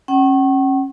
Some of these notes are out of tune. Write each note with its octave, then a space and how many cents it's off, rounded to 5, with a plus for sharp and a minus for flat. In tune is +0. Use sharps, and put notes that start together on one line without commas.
C#4 -30 F#5 +45